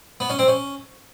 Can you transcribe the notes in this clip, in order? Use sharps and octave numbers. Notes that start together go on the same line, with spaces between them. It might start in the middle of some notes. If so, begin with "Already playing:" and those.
B3
C#4
C4
C#4